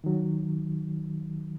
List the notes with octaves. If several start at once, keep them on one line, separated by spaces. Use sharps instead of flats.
D#3 F#3